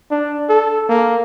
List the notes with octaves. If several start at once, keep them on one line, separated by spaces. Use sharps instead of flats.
D4
A4
A#3